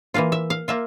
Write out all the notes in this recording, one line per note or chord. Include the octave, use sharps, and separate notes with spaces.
E3 A#3 F4 F5
E5
F5
A#3 F4 E5